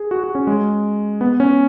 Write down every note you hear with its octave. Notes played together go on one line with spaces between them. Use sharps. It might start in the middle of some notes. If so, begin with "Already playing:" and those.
Already playing: G#4
F#4
F#4
C#4
G#3
B3
C#4